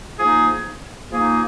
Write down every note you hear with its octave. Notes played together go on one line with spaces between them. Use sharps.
F3 A#3 D#4 G#4
F3 A#3 D#4 G#4